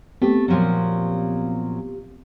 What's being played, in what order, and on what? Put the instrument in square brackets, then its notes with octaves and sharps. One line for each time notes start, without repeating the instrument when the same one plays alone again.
[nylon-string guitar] A3 [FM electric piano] B3 C4 G4
[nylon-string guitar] A#2 F3 F#3